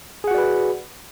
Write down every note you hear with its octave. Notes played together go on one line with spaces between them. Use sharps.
F#4 G#4 B4 D5 F#5